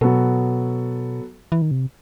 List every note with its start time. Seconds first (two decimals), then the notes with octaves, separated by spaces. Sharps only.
0.01 B2 F#3 B3 F#4 A4
1.52 E3
1.62 D#3
1.71 C3